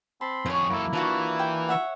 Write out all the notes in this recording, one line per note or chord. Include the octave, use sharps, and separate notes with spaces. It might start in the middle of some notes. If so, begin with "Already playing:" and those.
C4 A5 B5 C6
F2 G#4 C5 C#5
F#2 A#3 E4 A4
E3 D4 F4 F#4
G5
C#5 E5 F#5